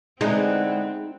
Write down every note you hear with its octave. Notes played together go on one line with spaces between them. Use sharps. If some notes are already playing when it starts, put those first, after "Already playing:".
D3 E3 G#3 B3 C4 D#4